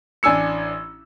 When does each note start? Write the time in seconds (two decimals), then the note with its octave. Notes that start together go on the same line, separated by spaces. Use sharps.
0.23 A1 D4 G#5 E6 C#7